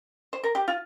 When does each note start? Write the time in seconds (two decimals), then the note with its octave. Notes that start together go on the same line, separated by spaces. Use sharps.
0.33 C5
0.44 A#4
0.55 G4
0.68 F4